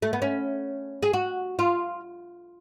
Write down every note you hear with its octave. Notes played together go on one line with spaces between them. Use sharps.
A3
B3
C#4
G#4
F#4
F4